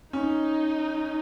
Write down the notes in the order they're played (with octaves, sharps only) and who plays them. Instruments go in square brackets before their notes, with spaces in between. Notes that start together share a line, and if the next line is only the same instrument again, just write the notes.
[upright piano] C#4 [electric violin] D#4